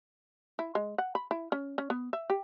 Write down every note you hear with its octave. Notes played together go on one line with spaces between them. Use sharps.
E4
G#3
F#5
B5
E4
C#4
C#4
B3
E5
G4